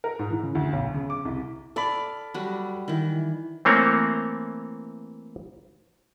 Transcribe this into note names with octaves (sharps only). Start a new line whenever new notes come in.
A#4
G#2
E3
C#3
D2
B1
C#3
D6
C2
A4 D5 F5 B5
F#3 G3
D#3 E3
E3 A3 A#3 C4 C#5